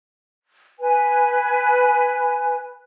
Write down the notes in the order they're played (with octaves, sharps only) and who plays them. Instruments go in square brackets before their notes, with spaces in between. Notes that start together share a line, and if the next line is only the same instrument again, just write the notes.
[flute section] B4 G#5